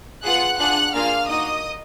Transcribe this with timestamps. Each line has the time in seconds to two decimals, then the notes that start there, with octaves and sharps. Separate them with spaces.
0.24 B3 F4 G#4 F#5 F#6
0.59 D4 F4 G#4 F#5 F#6
0.94 A#3 D4 F4 G#4 F5 F6
1.28 A#3 D#4 F#4 D#5 D#6